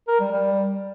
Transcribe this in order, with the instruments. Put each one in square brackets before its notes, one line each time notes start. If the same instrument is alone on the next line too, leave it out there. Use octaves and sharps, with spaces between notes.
[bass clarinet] A#4
G3
G3